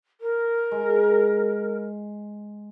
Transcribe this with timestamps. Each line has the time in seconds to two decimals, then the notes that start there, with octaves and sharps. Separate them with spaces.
0.21 A#4
0.71 G#3